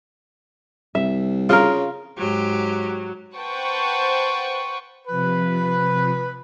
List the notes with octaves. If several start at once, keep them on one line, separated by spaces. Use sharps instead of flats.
C2 E5
C#3 F4 A#4
G#2 F#3 G4
B4 C5 F#5 G5 A5 C#6
C3 F3 B4